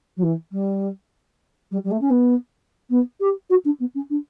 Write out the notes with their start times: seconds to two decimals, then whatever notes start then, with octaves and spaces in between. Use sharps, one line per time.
0.17 F#3
0.23 E3
0.52 G3
1.71 G3
1.84 G3
1.91 A3
2.01 C#4
2.10 B3
2.90 B3
3.20 G4
3.50 F#4
3.65 D4
3.80 B3
3.94 C#4
4.10 D4